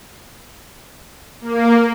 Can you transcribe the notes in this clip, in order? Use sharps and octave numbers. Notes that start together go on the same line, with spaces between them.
A#3